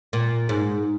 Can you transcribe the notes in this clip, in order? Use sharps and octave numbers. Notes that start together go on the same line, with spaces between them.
A#2
G#2